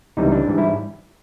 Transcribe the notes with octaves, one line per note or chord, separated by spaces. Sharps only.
C#2 C3 E3 G3 D#4
D4
G#2 E3 G3
E4